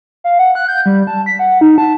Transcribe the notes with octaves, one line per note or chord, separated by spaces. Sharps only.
F5
F#5
F#6
G6
G3
A5
B6
F#5
D#4
A5